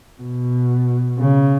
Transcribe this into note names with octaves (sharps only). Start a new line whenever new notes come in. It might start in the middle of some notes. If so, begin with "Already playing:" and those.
B2
C#3